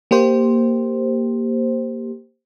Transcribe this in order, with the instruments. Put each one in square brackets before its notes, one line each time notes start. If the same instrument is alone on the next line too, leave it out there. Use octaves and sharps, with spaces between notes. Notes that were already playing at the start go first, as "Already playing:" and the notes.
[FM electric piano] A#3 G4 C5